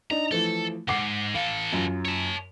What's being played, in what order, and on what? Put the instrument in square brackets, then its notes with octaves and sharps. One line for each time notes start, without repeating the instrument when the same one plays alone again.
[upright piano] D4 D#4 [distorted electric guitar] A#5
[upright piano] E3 F3 A3 [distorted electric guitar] A4
[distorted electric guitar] C#2 G#2 [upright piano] F#5 D6 C7
[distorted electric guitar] E3 A4 [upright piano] F5
[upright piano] F#2 F4
[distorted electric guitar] C#5 A5